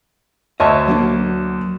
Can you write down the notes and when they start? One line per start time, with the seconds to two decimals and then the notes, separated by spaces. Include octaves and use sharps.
0.60 D2 C#5 D#5 E5 A5
0.88 F#3 A#3 D4